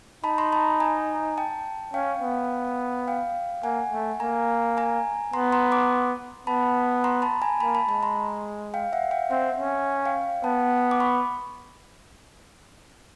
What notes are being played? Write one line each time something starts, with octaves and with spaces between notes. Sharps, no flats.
D#4 A5 B5
A#5 C6
A5 B5
G#5 A#5
G5 A5
C#4 F5 G5
B3
F5 G5
A#3 F#5 G#5
A3
A#3 G#5 A#5
G#5 A#5
B3 A#5 C6
A#5 C6
C6 D6
B3 A5 B5
A#5 C6
A5 B5
G#5 A#5
A#3 A5 B5
A5 B5
G#3 A5 B5
A#5 C6
F5 G5
E5 F#5
F5 G5
C4 E5 F#5
C#4
F5 G5
B3 G5 A5
D6
B5 C#6